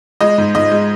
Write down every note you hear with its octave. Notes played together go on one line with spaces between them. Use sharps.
G#3 D#5
G#2
G#2 D#5
G#3